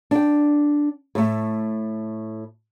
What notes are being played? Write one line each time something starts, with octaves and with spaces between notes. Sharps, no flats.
D4 G5
A2 A3